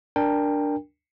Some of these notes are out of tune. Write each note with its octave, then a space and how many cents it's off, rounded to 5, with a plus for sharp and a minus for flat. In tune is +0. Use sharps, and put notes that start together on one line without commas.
D4 +0 A#4 +0 G5 +20